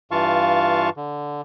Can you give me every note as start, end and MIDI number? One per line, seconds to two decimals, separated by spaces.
0.11 0.90 43
0.11 0.90 52
0.11 0.90 65
0.11 0.90 77
0.11 0.90 81
0.11 0.90 85
0.97 1.41 50